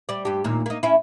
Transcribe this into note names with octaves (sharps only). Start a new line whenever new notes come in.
G3 D5
G2 G4
D#2 A#2
A#3 D#4
C#4 E4